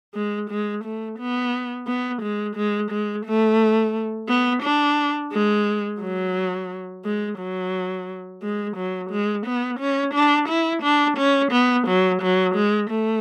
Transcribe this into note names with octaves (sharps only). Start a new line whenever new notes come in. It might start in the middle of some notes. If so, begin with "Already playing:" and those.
G#3
G#3
A3
B3
B3
G#3
G#3
G#3
A3
B3
D4
G#3
F#3
G#3
F#3
G#3
F#3
G#3
B3
C#4
D4
E4
D4
C#4
B3
F#3
F#3
G#3
A3